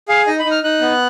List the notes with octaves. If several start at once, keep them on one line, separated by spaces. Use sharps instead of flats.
G#4 F5
D#4 D#5
B5
D#4
F6
D#4 F#6
B3